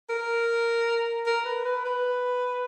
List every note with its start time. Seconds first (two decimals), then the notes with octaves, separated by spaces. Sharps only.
0.09 A#4
1.26 A#4
1.45 B4
1.65 B4
1.85 B4